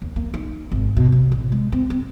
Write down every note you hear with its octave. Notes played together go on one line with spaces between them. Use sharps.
D#2
A#3
D#4
G#1
B2
C3
A1
G#3
C4
C4